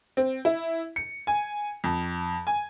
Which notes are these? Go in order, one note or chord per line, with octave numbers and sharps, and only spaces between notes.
C4
E4
C#7
G#5
F2
G#5